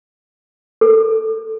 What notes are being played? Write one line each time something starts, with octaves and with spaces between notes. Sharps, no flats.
A4